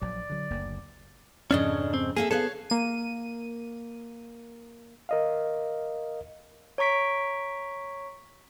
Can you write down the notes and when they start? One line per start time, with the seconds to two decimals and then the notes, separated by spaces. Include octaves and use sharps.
0.02 A#1 F#3 D5
0.30 D3 F#3
0.50 F#1 D2 A#3
1.51 F2 G#2 C#3 C#4 D4 D#5
1.94 C4
2.17 A#3 G#4 A4 E5
2.31 B3 G#4 A4 C#5 D5 F5
2.70 A#3 D#7
5.09 A#4 D#5 F5
6.78 C#5 A#5 C#6 B6 D7